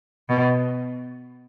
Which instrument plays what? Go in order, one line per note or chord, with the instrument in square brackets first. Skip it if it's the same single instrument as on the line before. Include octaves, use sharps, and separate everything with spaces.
[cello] B2